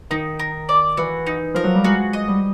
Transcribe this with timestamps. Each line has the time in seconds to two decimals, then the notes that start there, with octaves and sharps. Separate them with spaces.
0.10 D#3 D#4
0.39 A#4
0.69 D5
0.97 E3 F#4
1.26 D#4
1.54 F3 A#4
1.64 F#3
1.75 G3
1.84 G#3 F#4
2.13 D#5
2.28 G3